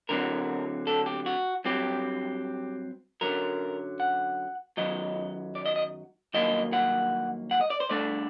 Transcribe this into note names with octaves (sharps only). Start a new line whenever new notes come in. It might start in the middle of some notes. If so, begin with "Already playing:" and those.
D2 D3 F#3 C4 A#4
A4
G4
F#4
G2 F#3 C4 G4
F#2 D3 F#3 A#4
F#5
F#2 D#3 F#3 D#5
D5
D#5
D#5
G2 D#3 F#3 A#3 D#5
F#5
F#5
D#5
D5
C5
G2 D3 A3 D4 D5